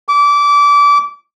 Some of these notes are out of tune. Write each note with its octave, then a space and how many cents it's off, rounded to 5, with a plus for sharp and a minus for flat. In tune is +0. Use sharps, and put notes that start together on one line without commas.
D6 -25